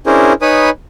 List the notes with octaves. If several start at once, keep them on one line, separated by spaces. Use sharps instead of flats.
C#4 D4 E4 G#4 A#4 C5
D#4 B4 C#5 G#5 B5 D#6